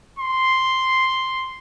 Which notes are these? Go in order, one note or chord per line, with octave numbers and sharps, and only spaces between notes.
C6